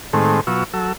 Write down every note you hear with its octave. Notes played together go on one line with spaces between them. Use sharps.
A2 D#3 G#3 A3 C4
B2 F#3 F4 C#6 E6
F#3 A4 E6